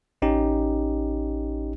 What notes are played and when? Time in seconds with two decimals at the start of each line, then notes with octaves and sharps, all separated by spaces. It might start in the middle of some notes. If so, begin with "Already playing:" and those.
0.22 A1 C#4 D#4 G4